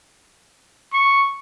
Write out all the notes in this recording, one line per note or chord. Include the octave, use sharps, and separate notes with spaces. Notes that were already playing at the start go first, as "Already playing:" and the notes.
C#6